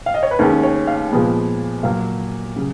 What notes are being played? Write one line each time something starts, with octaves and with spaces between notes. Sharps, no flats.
F5
D#5
C#5
B4
D#2 D#3 G#3 C#4 A#4
C#5
F5
A#2 F3 G#3 B3
A#2 F#3 A#3 F5
C#3 F#3